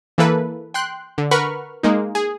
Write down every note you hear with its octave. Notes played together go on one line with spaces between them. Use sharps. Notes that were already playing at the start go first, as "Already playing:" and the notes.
E3 A#3 A4 B4
G5 C6 F#6
D3
A#4 B4 F#5 B5 C#6 F6
G#3 A#3 D#4
G#4